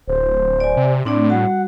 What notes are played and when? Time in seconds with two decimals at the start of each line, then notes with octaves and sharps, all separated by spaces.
0.08 D1 C5
0.60 D5 G#5
0.77 C3
1.05 A2 C4 D4 D5
1.30 G3 F#4 F#5